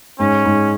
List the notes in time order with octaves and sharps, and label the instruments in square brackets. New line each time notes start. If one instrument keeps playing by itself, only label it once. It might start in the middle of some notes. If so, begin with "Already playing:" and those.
[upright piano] G#2 [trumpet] C#4
[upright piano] G#2